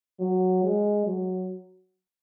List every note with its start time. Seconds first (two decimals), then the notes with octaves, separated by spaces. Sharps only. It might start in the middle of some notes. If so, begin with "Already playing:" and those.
0.20 F#3
0.64 G#3
1.07 F#3